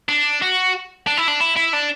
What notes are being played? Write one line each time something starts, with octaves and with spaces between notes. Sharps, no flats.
D4
F#4
D4
E4
D4
E4
E4
D4